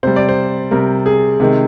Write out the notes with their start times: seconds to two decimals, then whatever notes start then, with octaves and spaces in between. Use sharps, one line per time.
0.03 C3 G3 C5
0.16 D5
0.29 C5
0.71 C3 G3 A#4
1.06 G#4
1.40 C3 D#3 G#3